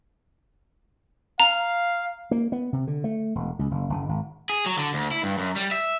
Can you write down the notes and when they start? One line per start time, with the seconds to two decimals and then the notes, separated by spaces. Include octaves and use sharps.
1.40 F5 A#5
2.31 A#3
2.52 B3
2.73 C3
2.87 D3
3.04 A3
3.35 E1
3.59 C#2
3.71 F#1
3.90 F#1
4.09 G#1
4.49 G#4
4.66 F#3
4.78 D3
4.94 D2
5.11 E4
5.23 G2
5.38 F#2
5.56 G3
5.71 E5